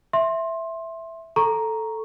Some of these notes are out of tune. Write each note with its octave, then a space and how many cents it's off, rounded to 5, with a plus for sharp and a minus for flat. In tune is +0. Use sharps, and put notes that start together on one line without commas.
E5 +0 C6 +20
A4 +0 A#5 +0 C#6 +0